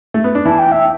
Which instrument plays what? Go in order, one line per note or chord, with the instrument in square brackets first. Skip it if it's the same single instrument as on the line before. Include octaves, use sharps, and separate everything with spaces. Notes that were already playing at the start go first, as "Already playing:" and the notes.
[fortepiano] A3
B3
D4
[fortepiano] E3 E4 [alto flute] A5
[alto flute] G5
E5